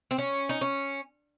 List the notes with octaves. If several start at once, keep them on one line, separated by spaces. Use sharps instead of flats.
C4
C#4
D#4
C#4